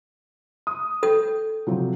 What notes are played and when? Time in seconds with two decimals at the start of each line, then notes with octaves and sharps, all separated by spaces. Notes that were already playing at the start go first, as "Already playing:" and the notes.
0.67 D#6
1.03 A4 G5 D#6
1.67 C3 F3 F#3